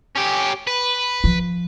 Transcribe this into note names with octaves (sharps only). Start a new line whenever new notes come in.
C#4 G4
B4
F3